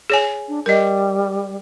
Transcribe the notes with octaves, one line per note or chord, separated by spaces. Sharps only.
G#4 C#5 G#5
D4
G3 A#4 D#5